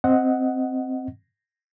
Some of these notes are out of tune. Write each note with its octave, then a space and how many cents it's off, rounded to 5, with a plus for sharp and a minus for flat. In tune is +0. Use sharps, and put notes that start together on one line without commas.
C4 +0 D#5 +10 F#5 +0